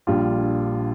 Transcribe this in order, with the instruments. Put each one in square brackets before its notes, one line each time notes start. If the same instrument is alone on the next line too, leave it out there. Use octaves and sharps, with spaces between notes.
[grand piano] A#1 A#2 G3 D4 F4